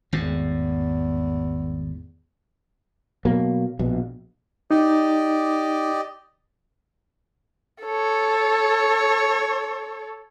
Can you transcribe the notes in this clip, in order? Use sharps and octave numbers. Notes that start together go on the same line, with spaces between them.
G#1 E2 A2
B2 F#3 A#3
A#1 B2
D#4 G4 D5 D#5
A4 C#5